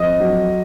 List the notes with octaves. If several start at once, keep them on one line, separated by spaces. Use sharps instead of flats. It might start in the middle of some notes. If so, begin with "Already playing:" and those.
Already playing: F2 D#5
F#3